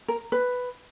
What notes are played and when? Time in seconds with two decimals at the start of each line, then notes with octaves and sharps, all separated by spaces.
0.08 A#4
0.32 B4